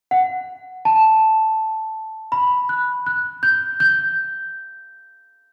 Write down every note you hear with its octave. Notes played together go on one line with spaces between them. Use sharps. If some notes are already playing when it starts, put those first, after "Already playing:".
F#5
A5
B5
F#6
F#6
G6
G6